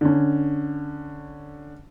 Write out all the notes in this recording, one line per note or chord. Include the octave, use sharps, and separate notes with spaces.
D3 C#4